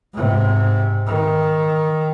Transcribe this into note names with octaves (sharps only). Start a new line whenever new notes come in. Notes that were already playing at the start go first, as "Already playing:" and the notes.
G#2 C3
D#3